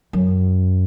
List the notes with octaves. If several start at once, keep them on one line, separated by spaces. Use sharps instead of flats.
F#2